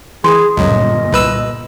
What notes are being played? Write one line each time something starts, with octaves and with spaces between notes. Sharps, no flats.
E3 G#4 C6
G1 C#2 F#2 A#2 D#5
C2 B4 E6